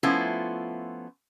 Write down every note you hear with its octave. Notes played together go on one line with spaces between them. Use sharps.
F3 A3 B3 C#4 E4 F4